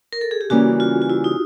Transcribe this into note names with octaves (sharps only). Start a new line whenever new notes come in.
A#4
A4
G#4
G4
C#3 E3 G3 A#3 C#4 F#4
F4
F4
E4
D#4